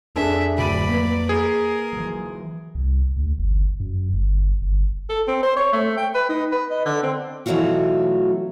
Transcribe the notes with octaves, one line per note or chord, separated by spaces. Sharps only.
F2 C4 D4 G#4 A4 E5
D1 D5 B5 D#7
A#3 B4
G#4 A#4
E3 F#3
C2
D2
G1
F#2
G1
G1
A4
C4
C5
C#5
A3
G5
B4
D#4
B4
D#5
D3
C4
B2 E3 F#3 A3 F4 F#4